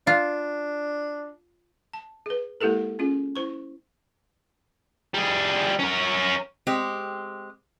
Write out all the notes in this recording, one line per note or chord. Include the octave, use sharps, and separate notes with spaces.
D4 F4
A5
G#4 B4
G#3 A#3 E4 G4 A4 A#4
C#4 F4 G#4
E4 C5 C#6
G3 G#4
C#4 A#4
G#3 C4 G4